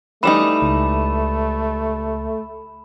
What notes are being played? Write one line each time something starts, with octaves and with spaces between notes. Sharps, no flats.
E3 G3 A3 D#4 B5 E7
C#2